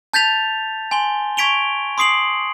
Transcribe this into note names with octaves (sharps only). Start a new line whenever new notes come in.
A5 G6 A6 B6 F7
G#5 C6 G7
C#6 G#6 B6 D7 F7 G7
C6 D6 D#6 C7 D7 F#7